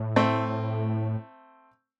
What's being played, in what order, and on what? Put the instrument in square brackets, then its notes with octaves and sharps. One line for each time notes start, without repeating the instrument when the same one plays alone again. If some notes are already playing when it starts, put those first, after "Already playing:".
Already playing: [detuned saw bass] A2
[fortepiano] A3 C4